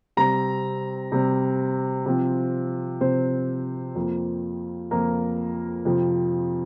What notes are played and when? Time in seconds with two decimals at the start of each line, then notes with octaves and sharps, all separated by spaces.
0.17 C3 G3 C4 A#5
1.12 C3 G3 C4
2.06 C3 F3 C4
3.01 C3 F3 C4 C5
3.95 F2 F3 A#3
4.91 F2 F3 A#3 A#4
5.85 F2 C3 F3